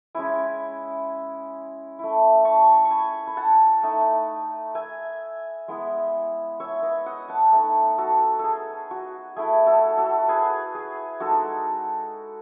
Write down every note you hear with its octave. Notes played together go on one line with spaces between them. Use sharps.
G#3 C#4 E4 G#5 B5
A3 E4
A5 C#6
C#6
G#5 B5
B5
F#5 A5
A3 D#4
E5 G#5
G#3 B3 E4
C#5 E5
B4 D#5
D#5 F#5
F#5 A5
A3 D#4
F#4 A4
G#4 A4
F#4
A3 E4 G#4
F#4 A4
F#4 A4
G#4 B4
G#4
G#3 D#4 F#4 A4